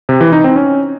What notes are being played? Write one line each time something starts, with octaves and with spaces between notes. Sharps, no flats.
C3
E3
D#4
C4
C#4